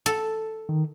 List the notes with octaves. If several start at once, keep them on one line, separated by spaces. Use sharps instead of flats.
A4
D#3